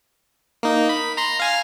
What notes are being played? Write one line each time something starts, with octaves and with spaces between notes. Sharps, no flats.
A#3 D#4
B5
A#5 C6
F5 G#5 F6